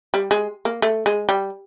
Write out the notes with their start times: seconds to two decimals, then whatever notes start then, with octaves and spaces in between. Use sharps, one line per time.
0.14 G3
0.31 G#3
0.65 A#3
0.82 A3
1.06 G#3
1.29 G3